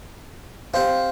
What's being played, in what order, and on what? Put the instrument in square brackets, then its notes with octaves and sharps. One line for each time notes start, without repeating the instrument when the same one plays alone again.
[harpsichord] C4 [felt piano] G4 F5